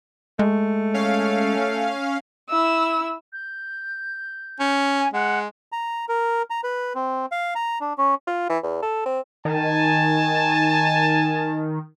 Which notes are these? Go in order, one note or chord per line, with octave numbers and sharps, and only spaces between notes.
G#3 A3
C#4 F5
E4 E6
G6
C#4
G#5
G#3 F#5
A#5
A#4
A#5
B4
C4
F5
A#5
D4
C#4
F4
E3
E2
A4
C4
D#3 G#5 A5